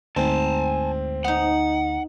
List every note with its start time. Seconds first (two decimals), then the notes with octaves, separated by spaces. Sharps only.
0.16 D2 G#2 C4 G#5 A5
1.24 B3 D#4 F#5